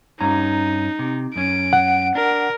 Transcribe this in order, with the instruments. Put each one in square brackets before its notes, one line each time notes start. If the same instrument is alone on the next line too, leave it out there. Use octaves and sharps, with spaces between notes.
[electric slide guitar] G2 C#4 A#5 [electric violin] D#4
[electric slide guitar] C3
[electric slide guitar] F#2 C#4 [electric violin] D7
[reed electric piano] F#5
[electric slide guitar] D4 [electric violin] A#4